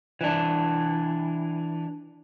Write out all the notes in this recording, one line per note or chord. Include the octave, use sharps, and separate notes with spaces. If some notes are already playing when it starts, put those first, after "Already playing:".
E3 D4